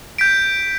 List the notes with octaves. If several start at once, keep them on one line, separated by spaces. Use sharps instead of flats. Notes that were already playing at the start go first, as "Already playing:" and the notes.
G6 B6 D7